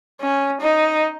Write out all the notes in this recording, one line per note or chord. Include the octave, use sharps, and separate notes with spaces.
C#4
D#4